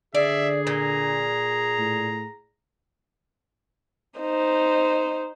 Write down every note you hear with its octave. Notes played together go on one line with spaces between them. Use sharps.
D3 G#4 D5 E5
A#2 A#5
A2
D#4 C5